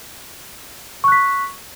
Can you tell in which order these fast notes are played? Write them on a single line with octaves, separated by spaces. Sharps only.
C#6 F#6 B6